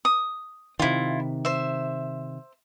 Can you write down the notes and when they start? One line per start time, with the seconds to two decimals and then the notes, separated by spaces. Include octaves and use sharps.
0.05 D#6
0.79 C3 D#3 E4 F4
1.45 C5 E5